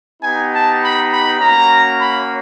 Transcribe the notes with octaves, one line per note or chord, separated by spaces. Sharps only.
B3 D#4 G4 G#5
A5
B5
B5
A#3 C#4 F#4 A#5
B5